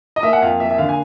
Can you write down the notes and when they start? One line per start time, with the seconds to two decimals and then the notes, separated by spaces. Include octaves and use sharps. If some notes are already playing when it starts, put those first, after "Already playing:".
0.16 D#5
0.23 A#3 E5
0.33 F#5
0.42 F2 F5
0.60 A#3 E5
0.71 E5
0.78 D3 F5
0.89 G#5